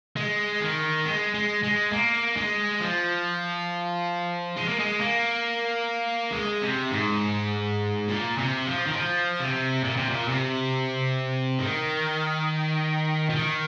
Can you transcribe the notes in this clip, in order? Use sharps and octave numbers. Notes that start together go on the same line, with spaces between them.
G#3
D#3
G#3
G#3
G#3
A#3
G#3
F3
G#3
A#3
G#3
A#3
G#3
C3
G#2
A#2
C3
F3
D#3
F3
C3
A#2
C3
A#2
C3
D#3
F3
D#3